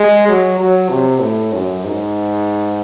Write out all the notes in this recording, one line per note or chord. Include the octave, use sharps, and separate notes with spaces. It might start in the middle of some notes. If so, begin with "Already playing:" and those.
Already playing: G#3
F#3
F#3
C3
A2
F#2
G#2